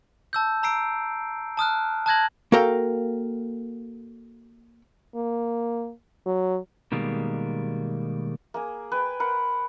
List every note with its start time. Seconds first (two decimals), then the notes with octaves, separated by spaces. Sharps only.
0.33 A5 E6 G6
0.63 A#5 E6 C7 D7
1.57 A5 D#6 F6 F#6
2.06 A5 D#6 F#6 G#6 A#6 F#7
2.52 A#3 F#4 A4 A#4 F5 G5
5.15 A#3
6.26 F#3
6.92 B2 D#3 G3 G#3 A#3
8.54 A#3 G#4 G#5
8.92 B4 G5 G#5
9.20 A#4 C5 F#5 B5